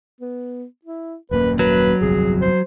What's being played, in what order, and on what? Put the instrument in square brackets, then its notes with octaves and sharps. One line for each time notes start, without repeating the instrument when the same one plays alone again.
[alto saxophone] B3
E4
[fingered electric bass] D#1 F#2 A#3 [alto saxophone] B4
[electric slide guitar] F#3 [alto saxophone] B4
[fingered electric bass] G1 C2 F2 [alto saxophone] G#4
[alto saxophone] C5